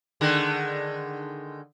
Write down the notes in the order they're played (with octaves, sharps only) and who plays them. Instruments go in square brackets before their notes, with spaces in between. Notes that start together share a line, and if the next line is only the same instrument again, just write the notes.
[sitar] D3 D#3 G#3